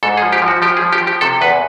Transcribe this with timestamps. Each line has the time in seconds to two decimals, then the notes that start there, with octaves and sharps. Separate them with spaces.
0.03 G#2 A4
0.17 G#4
0.22 F3
0.33 G4
0.42 F3
0.48 F#4
0.62 F3 G4
0.77 G#4
0.82 F3
0.93 G4
1.02 F3
1.07 G4
1.21 C3 A4
1.41 E2 B4